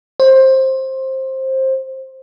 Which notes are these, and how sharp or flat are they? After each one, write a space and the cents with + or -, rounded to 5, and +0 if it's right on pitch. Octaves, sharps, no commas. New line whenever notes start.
C5 +15